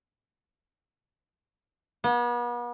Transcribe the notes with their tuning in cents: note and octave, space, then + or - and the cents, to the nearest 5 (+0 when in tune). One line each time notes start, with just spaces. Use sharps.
B3 -40